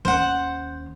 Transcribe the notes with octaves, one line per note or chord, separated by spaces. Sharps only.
D#2 C#4 C5 F#5